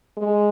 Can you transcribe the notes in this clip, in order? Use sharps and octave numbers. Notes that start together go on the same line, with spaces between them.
G#3